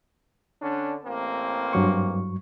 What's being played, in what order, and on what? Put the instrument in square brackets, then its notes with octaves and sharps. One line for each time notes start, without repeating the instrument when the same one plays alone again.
[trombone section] D3 C#4 D4
A1 A#3 C4
[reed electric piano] G2 F#3 C#6